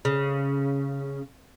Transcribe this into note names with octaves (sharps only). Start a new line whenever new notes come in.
C#3